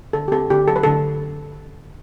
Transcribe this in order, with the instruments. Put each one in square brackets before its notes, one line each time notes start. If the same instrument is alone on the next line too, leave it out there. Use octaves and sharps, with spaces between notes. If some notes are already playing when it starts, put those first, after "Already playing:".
[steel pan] D3 A4
G4
C4 A4
D3 G4
F#3 A4
B4
D3 A4